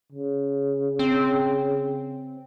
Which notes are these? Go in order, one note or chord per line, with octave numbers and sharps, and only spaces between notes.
C#3
C4